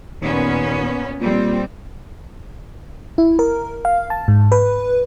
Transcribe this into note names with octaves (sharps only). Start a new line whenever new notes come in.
D#2 A#2 B3 C#4
A#2 G3 C4
E4
A#4
F5
A5
G#2
B4